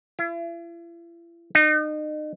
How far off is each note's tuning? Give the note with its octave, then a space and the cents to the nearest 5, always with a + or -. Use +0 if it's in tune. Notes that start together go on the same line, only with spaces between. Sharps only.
E4 +45
D#4 -35